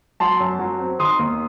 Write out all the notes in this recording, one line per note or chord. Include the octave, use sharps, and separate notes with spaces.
F#3 A5 C6
F#2
F#3
C4
D#3 C6 D#6
D#2